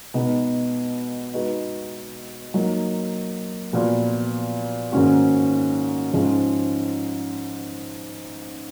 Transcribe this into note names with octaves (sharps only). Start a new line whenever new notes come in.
B2 G#3 B3 D#4
G#3 D#4 F#4 B4
F#3 A#3 D#4
A#2 F3 B3 F#4 B4
G#2 D#3 A#3 C#4 F#4
G#2 F3 G#3 C#4